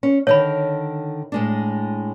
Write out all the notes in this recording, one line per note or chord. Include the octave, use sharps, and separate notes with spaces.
C#4
D3 D#3 C#5 B5
A2 G#3 D4